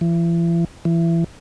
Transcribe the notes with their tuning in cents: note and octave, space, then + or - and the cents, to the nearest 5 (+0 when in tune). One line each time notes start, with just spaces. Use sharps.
E3 +40
E3 +25